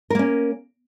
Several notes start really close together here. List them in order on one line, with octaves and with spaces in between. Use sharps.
A#4 A#3 C#4